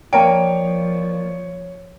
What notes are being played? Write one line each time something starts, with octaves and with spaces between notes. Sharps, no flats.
F3 A#3 A#4 C#5 D5 G5 A5 D7